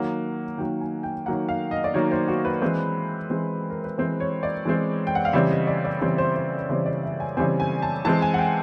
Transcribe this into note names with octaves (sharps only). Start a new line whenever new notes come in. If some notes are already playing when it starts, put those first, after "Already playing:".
Already playing: D#3 F#3 A#3 F#5
D#3 F#3 A#3 G5
G#5
G5
D#3 F#3 A#3 F#5
F5
D#5
D5
D#3 F#3 A#3 C#5
C5
F#4
B4
E3 G#3 C4
E3 G#3 C4
A#4
B4
E3 G#3 C4 C5
C#5
D5
E3 G#3 C4
G5
F#5
F5
C#3 E3 G3 C4 E5
D#5
D5
D5
C#3 E3 G3 C4 C#5
C5
C5
C#3 E3 G3 C4 C5
D5
E5
G#5
C#3 E3 G3 C4 G#5
G#5
A5
E3 G#3 C4 A5
G#5
F#5
G5